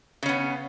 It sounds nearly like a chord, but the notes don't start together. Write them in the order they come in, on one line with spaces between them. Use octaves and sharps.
C#3 C#4 B3